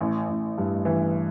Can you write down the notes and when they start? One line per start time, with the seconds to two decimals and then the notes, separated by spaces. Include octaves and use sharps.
0.01 A1
0.28 A1
0.58 G2
0.85 E3